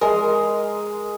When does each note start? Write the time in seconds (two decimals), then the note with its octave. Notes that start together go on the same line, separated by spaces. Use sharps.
0.01 G#3 A#4 C6